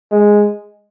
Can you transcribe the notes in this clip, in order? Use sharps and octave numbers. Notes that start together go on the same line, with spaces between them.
G#3